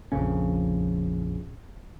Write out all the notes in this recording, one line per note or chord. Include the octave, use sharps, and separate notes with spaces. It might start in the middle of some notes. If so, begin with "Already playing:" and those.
A#1 F2 C#3 C#4